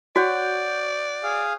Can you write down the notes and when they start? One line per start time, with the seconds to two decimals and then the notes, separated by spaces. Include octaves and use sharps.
0.16 F#4 C#5 D5 F#5 G5
1.23 G#4 F5